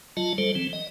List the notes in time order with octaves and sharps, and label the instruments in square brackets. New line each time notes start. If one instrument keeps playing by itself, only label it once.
[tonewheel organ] F#3 F4 D#5 A5
F#3 G3 A4 C5
E3 C4
D#5